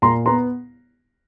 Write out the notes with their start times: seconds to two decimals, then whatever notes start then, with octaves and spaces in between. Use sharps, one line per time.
0.02 A#2 A#5 C6
0.26 B3 A#5 C6